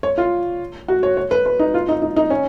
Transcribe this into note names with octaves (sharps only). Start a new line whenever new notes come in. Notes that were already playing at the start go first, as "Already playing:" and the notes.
C#5
F4
F#4
C#5
C#5
B4
B4
D#4
F4
D#4
D#4
D#4
C#4